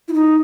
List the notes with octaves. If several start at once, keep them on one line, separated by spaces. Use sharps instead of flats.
E4
D#4